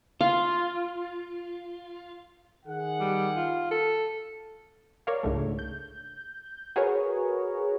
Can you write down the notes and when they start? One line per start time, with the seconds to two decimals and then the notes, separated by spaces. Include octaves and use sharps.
0.21 F4 F5
2.66 D#3 G#4 F#5
3.00 G3
3.36 F4
3.71 A4
5.07 A#4 C#5 D5 F5
5.23 C#2 G#2 D3 A3
5.59 G6
6.76 F#4 G#4 A#4 B4 C#5